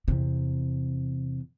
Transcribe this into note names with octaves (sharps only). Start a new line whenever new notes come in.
E2 C3